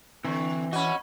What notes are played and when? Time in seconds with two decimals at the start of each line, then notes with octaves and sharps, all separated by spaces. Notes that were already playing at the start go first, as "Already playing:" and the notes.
0.25 D3 E3 C4
0.73 C#4 F#4 D#5 B5